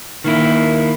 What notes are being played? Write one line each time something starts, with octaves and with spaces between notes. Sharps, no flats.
D#3 A#3 E4